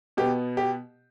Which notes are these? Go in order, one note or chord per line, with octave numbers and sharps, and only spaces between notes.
B2 B3 G4
G4